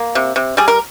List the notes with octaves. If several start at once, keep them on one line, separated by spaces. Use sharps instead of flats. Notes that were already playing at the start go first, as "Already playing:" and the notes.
Already playing: A#3
C3
C3
G3 G#4
A#4